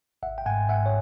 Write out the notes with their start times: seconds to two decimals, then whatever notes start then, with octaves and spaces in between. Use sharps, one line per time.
0.23 G#1 E5 F#5
0.38 G5
0.46 G#2 F#5 G#5
0.69 G#2 E5 F#5
0.86 C#5